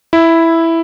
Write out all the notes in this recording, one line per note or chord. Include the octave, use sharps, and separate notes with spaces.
E4